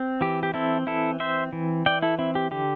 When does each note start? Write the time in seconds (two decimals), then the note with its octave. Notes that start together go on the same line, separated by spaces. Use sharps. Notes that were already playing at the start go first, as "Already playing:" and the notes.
Already playing: C4
0.21 E3 G4
0.43 G4
0.54 C4 E4 A4
0.87 E3 E4 A4
1.20 C4 C5 E5
1.53 E3
1.86 E3 D5 G5
2.02 E4 A4
2.19 C4 E4
2.35 G4
2.51 D3 G4